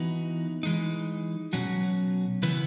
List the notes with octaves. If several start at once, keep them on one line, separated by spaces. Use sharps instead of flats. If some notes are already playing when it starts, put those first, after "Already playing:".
Already playing: E3 B3 D#4 F#4 B4
E3 G#3 D#4
B2 F#3 C#4 F#4
C#3 E3 B3 E4 B4